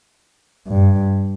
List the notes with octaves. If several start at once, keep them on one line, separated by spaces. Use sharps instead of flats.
G2